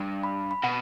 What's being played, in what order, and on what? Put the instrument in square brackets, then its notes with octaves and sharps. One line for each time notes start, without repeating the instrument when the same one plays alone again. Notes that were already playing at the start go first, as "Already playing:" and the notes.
Already playing: [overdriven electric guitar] G2
[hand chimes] B5
B5
[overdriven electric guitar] B2 [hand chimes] F#5